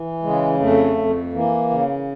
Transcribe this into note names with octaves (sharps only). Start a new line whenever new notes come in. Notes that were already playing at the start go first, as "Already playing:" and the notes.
Already playing: E3
C#3 G#3
F2 A3
F2
E3 A#3
C#3